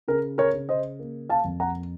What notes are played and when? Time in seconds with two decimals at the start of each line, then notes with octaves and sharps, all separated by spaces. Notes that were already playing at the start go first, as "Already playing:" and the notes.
0.08 C#3 A#4
0.38 A#4 C#5
0.54 C#3
0.69 C5 D#5
0.99 A#3
1.29 F5 A5
1.44 F2
1.60 F#5 A#5